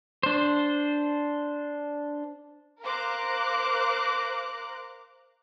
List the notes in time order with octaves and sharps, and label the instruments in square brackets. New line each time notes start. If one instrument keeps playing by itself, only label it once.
[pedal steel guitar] D4 C5
[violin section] A#4 C5 F5 A#5 D6 F#6